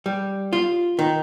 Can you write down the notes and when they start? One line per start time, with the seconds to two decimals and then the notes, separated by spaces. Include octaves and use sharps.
0.06 G3
0.53 F4
0.99 D#3